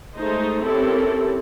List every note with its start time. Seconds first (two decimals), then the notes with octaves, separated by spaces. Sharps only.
0.17 G#3 A3 D#4 C5
0.65 C4 C#4 E4 G4 A4 A#4